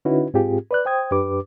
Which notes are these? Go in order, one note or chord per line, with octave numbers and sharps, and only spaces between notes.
D3 C#4 D#4 E4 F#4 B4
G#2 C4 F4 G4 G#4
B4 D5 F#6
C5 G5 D#6 G#6
F#2 D4 G4 B4 D6